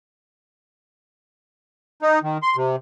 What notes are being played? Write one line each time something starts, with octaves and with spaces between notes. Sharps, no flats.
D#4
D#3
C6
C3